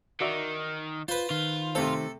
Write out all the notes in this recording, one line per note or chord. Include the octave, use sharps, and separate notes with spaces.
D#3 F#4 D5 E5
F4 B4 C5
D#3 F4
C3 A3 C4 A4